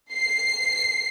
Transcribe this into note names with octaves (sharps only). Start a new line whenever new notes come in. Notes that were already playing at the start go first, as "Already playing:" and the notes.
C7